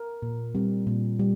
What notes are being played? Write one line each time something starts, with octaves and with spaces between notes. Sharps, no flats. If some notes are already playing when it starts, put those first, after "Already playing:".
Already playing: A#4
A#2
G3 C4
A#2
G3